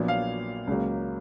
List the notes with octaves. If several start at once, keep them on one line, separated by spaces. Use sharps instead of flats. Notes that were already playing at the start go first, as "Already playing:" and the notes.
Already playing: A#1 A#2 F#3 B3
F5
C#2 C#3 F#3 A#3